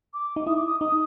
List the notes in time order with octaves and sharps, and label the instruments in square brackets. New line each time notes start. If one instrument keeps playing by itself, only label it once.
[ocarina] D6
[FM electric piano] D#4
[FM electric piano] E4 [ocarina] D#6
[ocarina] D6
D#6
[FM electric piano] D#4 [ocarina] D#6